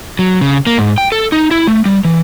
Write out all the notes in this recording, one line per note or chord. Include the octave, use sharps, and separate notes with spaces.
F#3
C#3
A#3
G#2
G5
A4
D#4
E4
A3
G3
E3